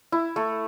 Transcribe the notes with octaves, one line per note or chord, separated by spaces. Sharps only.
E4
A3